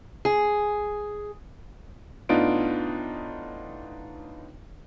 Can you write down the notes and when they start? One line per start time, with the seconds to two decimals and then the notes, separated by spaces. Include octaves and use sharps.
0.25 G#4
2.29 A2 B3 D4 D#4 F4 D7